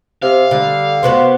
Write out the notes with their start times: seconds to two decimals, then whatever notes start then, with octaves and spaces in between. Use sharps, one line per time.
0.22 C3 F5
0.51 D3 G3
1.03 C3 B3 F#4 C5